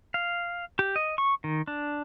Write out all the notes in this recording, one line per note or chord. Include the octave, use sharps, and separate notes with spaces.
F5
G4
D#5
C#6
D#3
D4